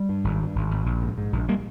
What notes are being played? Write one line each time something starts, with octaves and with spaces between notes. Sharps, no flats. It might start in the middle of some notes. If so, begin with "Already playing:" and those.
Already playing: G3
G2
G#1
G2
G#1
G#1
A#1
G#2
G#2
A#1
G3 A#3